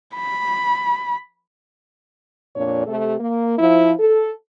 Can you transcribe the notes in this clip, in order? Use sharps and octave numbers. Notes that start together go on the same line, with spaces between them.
B5
F2 A#2 D4 C#5
C3 A3 G4 A4
A#3
F3 E4
A4